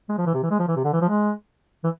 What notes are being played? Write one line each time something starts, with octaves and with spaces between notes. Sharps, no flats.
G#3
F3
E3
C3
E3
G#3
F3
E3
C3
D3
E3
F3
G#3
E3